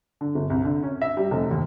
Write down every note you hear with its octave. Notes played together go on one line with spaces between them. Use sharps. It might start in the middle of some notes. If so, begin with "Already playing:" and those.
D3
G1
C2
D3
C#4
E5
G3
F1
D#2